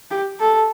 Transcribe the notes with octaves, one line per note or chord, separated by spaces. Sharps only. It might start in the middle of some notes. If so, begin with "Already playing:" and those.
G4
A4